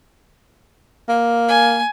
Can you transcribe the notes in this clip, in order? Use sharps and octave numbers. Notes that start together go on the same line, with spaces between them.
A#3
G#5